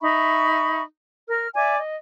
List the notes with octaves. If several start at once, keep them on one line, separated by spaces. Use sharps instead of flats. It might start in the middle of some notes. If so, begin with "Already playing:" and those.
D#4 E5 B5 C#6
A#4 F6
D5 E5 G#5 D6
D#5